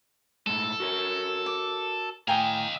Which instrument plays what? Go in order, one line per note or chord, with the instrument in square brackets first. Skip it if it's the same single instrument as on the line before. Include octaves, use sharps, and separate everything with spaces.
[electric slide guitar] A2 G#3 [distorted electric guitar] A4
[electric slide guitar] F#4 A#4 C#5
[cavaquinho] D6
[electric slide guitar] A2 [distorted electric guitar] D#5 F5 [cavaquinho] G5 G#5 A#5